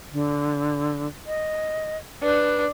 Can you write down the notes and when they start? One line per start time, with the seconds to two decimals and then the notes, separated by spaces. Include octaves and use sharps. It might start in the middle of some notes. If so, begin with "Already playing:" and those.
0.12 D3
1.27 D#5
2.22 D4 B4